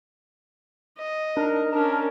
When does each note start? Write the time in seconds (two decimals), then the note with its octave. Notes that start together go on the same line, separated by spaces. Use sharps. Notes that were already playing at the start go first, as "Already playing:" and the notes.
0.98 D#5
1.37 D4 D#4 A#4
1.73 C#4 D4 A#4 A5